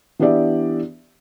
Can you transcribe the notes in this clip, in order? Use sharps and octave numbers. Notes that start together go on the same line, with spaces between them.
E3 B3 D4 G4 D5 E5